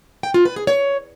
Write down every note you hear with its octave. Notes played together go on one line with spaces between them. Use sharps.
G5
F4
B4
G#4
C#5